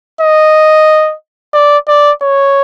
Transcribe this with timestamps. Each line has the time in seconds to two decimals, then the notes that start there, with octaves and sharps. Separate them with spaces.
0.21 D#5
1.54 D5
1.88 D5
2.22 C#5